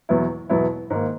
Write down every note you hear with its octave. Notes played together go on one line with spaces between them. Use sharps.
E2 B2 F#3 B3 E4
E2 B2 F#3 B3 E4
G#2 D#3 A#3